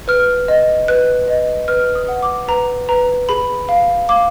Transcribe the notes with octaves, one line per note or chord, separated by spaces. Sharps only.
B4 F6
D#5
B4 F#6
D#5
B4 F6
D#6
F#5
D6
B4 A#5
B4 A#5
G#4 B5
F5
F5 D6